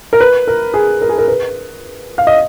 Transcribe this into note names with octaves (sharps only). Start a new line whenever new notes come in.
A#4
B4
A#4
G#4
A#4
G#4
A#4
B4
F5
D#5